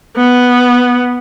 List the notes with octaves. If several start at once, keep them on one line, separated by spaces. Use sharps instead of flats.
B3